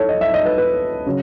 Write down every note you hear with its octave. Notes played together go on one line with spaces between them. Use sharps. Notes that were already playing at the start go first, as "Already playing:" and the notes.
Already playing: A4 C#5
D#5
E5
D#5
B4
B4
C#3 F#3